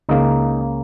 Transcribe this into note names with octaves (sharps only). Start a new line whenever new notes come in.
C#2 C#3 A#3 D#4